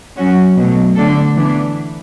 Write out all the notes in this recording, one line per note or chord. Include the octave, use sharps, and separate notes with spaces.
F#3 C#4 F#4
B2 F#3 A3
D3 A3 D4 A4
E3 B3 D4